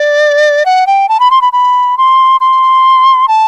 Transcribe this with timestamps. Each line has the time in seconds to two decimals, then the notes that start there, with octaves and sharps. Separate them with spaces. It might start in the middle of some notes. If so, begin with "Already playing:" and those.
Already playing: D5
0.66 F#5
0.87 G5
1.09 A5
1.20 B5
1.31 C6
1.41 B5
1.53 B5
1.98 C6
2.40 C6
3.28 A5